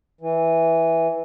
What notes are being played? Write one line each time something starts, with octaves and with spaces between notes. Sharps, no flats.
E3